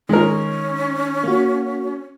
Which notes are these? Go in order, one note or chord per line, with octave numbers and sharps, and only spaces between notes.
D#3 G#3 C#4 A#4
A#3 F#4